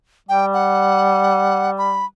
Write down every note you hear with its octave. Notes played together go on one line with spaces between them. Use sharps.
G3 G5
F#5
B5